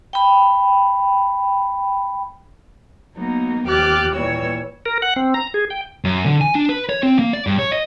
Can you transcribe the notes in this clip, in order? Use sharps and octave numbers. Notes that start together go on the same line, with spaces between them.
G5 B5
F#3 A#3 B3 D#4
D#2 G4 D6 F6 F#6 A6
A#2 E3 G3 A#3 C#5 E6
A#4
F#5
C4
A#5
G#4
G5
F#2
D3
G#5
D4
B4
C#5
C4
A#3
D5
G2
C#5
D#5